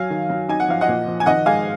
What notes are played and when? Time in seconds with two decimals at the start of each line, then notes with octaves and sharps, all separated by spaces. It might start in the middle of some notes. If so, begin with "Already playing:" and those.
Already playing: F#3 F5 G#5
0.10 D#3
0.29 F#3
0.49 D#4 G#5
0.60 F#5
0.68 F3 F5
0.81 D#5 F#5
0.88 A#2
1.07 F3
1.20 G#5
1.26 D#3 D#5 F#5
1.46 G#3 F5 G#5